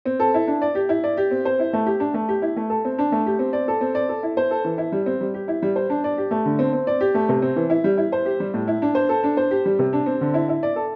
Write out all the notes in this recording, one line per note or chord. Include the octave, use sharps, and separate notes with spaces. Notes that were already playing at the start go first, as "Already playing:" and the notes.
C4
A4
E4
D4
D5
G4
E4
D5
G4
C4
C5
E4
A3
G4
D4
A3
G4
E4
A3
A4
C4
D4
A3
G4
C4
D5
A4
C4
D5
A4
E4
C5
A4
E3
E4
G3
C4
G3
G4
E4
G3
C5
D4
D5
G4
A3
D3
C4
C4
D5
G4
A3
C3
C4
E3
E4
G3
E4
C5
G4
G3
A2
E4
D4
C5
A4
D4
C5
G4
G3
C3
D4
C4
D3
E4
E4
D5
A4